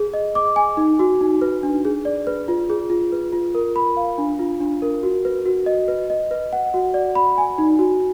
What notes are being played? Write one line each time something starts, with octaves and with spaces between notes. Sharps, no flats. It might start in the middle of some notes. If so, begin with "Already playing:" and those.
Already playing: G#4
D#5
D6
G#5
D#4
F#4
D#4
B4
D4
G#4
D5
B4
F4
G#4
F4
B4
F4
A#4
B5
F5
D4
F4
D4
A#4
F#4
B4
F#4
D#5
B4
D#5
B4
F#5
F#4
D5
B5
G#5
D#4
F#4